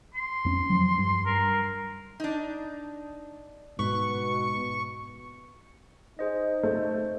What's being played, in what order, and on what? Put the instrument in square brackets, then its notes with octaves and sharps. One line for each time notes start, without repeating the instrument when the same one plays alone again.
[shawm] C6
[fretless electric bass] F2 C4 C#4
F3 F#3
G2
[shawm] A#4
[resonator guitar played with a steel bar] D4 D#4
[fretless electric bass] G#2 [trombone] B2 [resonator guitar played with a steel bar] B4 [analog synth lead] C#6
[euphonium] D#4 [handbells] G#4 C5 D#5
[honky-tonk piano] A3 [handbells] C5